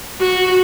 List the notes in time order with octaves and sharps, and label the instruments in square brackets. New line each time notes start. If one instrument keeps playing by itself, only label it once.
[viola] F#4